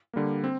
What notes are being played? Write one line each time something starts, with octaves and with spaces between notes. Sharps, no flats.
D3 G3 A#3
C4